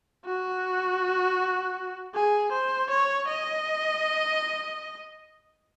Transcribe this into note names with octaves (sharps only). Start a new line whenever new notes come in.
F#4
G#4
C5
C#5
D#5